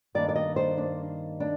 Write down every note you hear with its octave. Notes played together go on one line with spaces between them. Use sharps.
G2 D#3 G3 A#3 D4 D5
D5
D#5
C5
D4
D4